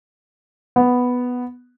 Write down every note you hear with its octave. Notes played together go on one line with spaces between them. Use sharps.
B3